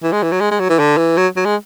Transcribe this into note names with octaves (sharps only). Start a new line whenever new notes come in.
E3
G#3
E3
F#3
G#3
G#3
F#3
E3
D3
E3
F#3
F#3
G#3